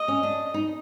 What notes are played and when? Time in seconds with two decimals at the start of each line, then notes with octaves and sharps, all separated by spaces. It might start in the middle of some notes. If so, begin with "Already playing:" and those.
Already playing: D#5
0.08 C#4
0.23 D4
0.54 D#4